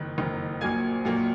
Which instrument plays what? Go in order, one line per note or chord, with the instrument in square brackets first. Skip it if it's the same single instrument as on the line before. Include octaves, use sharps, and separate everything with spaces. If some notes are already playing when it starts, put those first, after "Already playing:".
Already playing: [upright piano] F#1 F2 D#3 F#6
F#1 F2 D#3
A#1 A#2 F#3 A#3 G#5 G#6
A#1 A#2 F#3 A#3